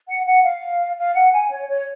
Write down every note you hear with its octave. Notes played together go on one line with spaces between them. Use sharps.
F#5
F#5
F5
F5
F#5
G#5
C#5
C#5